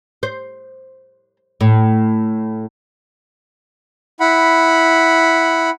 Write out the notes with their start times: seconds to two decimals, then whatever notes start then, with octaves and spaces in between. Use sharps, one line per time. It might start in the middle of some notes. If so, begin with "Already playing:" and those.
0.23 C5
1.61 A2
4.20 E4 F#5 B5